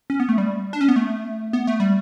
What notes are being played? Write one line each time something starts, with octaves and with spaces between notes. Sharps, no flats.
C#4
B3
A3
G3
D4
C#4
B3
A3
B3
A3
G3